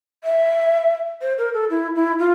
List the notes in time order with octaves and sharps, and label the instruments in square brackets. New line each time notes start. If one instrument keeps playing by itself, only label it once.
[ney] E5
C5
A#4
A4
E4
E4
F4